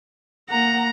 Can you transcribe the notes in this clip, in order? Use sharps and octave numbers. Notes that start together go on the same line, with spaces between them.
A#3 F#5 A#5